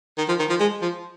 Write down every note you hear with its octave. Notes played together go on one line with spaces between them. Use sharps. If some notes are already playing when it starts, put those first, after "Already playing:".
D#3
F3
D#3
F3
G#3
F3